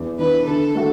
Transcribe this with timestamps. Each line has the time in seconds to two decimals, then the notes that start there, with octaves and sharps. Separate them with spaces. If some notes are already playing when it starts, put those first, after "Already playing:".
Already playing: E2
0.19 E3 D4 B4
0.46 D3 A4
0.75 A3 F#4